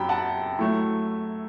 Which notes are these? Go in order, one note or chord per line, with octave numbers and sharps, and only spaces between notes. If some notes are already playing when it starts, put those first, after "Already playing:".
Already playing: F#2 F#3 G5 B5
F#5 A5
F#3 A3 E4